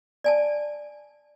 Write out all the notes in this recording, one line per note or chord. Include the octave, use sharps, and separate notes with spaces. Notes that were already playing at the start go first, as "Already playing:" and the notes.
D5 G#5 A5